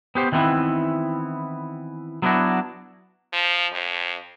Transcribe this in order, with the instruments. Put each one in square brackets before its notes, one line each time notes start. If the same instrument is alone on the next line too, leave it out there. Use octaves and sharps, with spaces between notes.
[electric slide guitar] B3 G4 C5
D#3 E3 B3 C4 E4
F#3 B3 C#4 D4 E4 F#4
[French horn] F3
F2